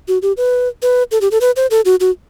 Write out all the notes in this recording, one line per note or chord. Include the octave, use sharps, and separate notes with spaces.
F#4
G4
B4
B4
A4
G4
A4
B4
C5
A4
F#4
F#4